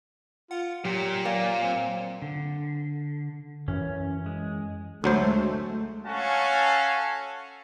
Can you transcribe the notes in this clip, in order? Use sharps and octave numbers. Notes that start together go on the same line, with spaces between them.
F4 F#5
A#2 F#3 G4
A#3 D5
C4
D3
F#2 E3 C#4
G#3
D2 F#3 G#3 A3 C5
C#4 F#4 A4 F5 G#5 A5